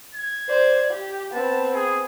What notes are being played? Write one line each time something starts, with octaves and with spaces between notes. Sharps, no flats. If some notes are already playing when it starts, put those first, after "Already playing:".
G#6
C5 D5
G4
B3 C4 A5
G#4